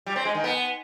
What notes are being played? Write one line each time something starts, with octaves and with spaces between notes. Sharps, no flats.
G3
C4
G#3
D#3
B3